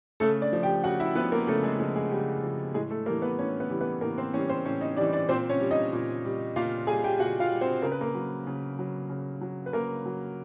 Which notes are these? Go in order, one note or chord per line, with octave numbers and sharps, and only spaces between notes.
C#3 A3 A4
D4 D5
F3
G4 G5
C#3 F#4 F#5
E4 E5
F3 B3 B4
A#3 A#4
C#3 A3 A4
G#3 G#4
F3 G#3 G#4
G#3 G#4
C#3 G3 G4
F3
A2 G#3 G#4
A3 A4
E3 G3 A#3 A#4
B3 B4
A2 C#4 C#5
B3 B4
E3 G3
B3 B4
A2 A#3 A#4
C4 C5
E3 G3 C#4 C#5
C4 C5
A2 C#4 C#5
D#4 D#5
E3 G3 D4 D5
D4 D5
A#2 C4 C5
C#4 C#5
G3
D#4 D#5
A#2
G3
A#2 F4 F5
G3 G#4 G#5
G4 G5
A#2 F#4 F#5
F4 F5
G3
C4 C5
C#3 A#4
B4
A#3 A#4
F#3
C#3
F#3
C#3
F#3
B4
C#3 A#3 A#4
F#3